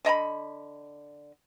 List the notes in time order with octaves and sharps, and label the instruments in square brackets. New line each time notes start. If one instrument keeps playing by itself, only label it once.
[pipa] D3 D#5 A#5 B5